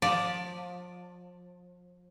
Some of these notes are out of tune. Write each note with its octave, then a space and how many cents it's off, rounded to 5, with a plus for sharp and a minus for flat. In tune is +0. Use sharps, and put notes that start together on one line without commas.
F3 +30 D5 +0 G5 +0